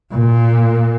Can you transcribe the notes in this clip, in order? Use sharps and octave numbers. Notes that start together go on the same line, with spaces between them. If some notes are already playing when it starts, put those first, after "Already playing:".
A#2